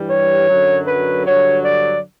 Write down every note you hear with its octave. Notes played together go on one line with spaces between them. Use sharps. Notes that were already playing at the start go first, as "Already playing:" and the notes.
Already playing: G2 E3 G3
C#5
F#2 D3 F#3
B4
G2 D3 F#3 C#5
D5